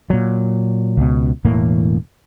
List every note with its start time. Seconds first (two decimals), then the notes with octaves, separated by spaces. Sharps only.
0.10 A#2 F#3
0.97 C#2 B2
1.45 E1 A2 E3 A#3